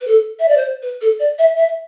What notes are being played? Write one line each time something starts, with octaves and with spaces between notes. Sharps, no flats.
B4
A4
E5
D5
C5
B4
A4
D5
E5
E5